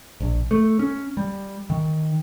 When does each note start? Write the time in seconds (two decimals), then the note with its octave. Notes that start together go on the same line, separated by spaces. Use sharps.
0.21 A#1
0.51 A3
0.79 C#4
1.17 G3
1.70 D#3